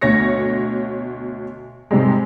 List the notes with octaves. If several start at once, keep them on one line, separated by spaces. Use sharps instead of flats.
D2 B2 C#5 A#6 C#7
G#2 C3 G3 G#3